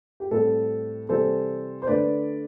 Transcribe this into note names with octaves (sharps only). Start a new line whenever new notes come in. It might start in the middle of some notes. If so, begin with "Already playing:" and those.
G4
A2 G3 C4 A4
C3 E3 G3 A4 C5
C5
D3 A3 D4 B4 D5